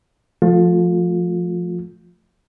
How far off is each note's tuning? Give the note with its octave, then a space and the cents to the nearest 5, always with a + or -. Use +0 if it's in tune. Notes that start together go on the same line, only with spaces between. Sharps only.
F3 +0 A3 +0 F4 +25